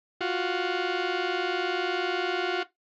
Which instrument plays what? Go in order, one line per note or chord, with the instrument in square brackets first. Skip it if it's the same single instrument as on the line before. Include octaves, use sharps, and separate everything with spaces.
[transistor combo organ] F4 F#4